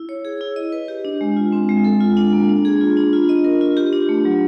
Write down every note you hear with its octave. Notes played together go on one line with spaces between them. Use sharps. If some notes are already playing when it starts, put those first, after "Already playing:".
Already playing: E4
C#5
G#4
E4
D#5
B4
G4
D4
G#3
F4
C4
G#3
A4
F4
D4
A#3
D4
G#4
F4
D4
F4
D#5
A#4
F4
G4
D4
A3
F#3